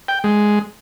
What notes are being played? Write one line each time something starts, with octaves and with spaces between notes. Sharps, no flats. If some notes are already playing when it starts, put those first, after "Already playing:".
G5
G#3